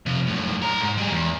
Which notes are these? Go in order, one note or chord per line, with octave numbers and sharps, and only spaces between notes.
C3 F3
F#2 A2
A4 A#5
G#2
G3 G#4
E2